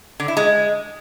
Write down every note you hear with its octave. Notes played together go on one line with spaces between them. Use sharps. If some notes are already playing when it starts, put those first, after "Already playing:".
D3
E4
G#3